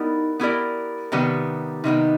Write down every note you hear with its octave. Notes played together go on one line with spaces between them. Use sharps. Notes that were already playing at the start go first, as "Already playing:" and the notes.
Already playing: B3 D#4 E4 G4 A#4 D5
B3 E4 G4 A#4 D5
C3 D#3 G3 B3
C3 D#3 G3 B3 D#4